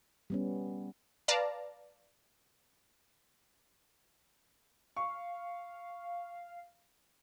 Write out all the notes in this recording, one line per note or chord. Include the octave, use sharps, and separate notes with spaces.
G3 B3 C#4
B4 D5 F5 A5 A#5
F5 C#6